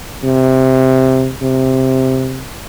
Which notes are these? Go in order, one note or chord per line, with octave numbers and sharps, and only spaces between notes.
C3
C3